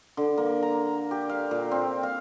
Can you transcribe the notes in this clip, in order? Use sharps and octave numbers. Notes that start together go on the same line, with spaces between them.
D3
A#3
A#5
G4
F5
A#2
C4
F5